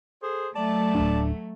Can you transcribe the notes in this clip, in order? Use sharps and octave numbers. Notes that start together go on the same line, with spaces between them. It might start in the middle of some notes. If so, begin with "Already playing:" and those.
G#4 A4 C5
F#3 A3 D5 A5
D1 G1 D4